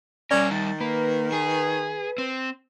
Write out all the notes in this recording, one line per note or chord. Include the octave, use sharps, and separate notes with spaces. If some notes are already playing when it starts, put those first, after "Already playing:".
G3 C#4 A#4 D5
D#3 A6
A#3 B4
G#4
C4